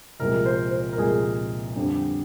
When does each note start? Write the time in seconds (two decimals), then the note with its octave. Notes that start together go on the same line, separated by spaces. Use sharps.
0.20 C2 A#2 F3 G#3 A#4
0.46 C5
0.71 C5
0.93 A#4
0.98 C2 A#2 F3 G#3 G#4
1.76 F2 D3 G3